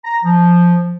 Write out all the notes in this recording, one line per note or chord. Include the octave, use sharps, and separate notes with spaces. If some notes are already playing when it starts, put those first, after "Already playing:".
A#5
F3